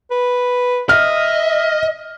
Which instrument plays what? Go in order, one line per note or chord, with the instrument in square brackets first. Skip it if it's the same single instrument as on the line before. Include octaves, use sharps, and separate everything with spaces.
[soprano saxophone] B4
[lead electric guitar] D#5 [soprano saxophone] E5 [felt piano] F6